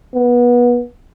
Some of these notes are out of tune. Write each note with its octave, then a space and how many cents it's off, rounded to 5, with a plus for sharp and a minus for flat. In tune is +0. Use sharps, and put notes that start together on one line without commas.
B3 -25